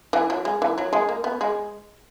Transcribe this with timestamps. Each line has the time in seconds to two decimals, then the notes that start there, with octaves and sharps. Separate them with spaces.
0.13 E3
0.30 F#3
0.45 G#3
0.62 E3
0.78 F#3
0.93 G#3
1.09 A#3
1.24 B3
1.41 G#3